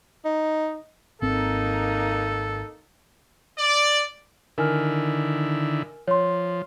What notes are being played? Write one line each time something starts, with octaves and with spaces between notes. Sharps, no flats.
D#4
G#1 A#3 C4 D#4 A4
D5
D3 D#3 E4 A#4 G#5 F6
F3 C#5 C6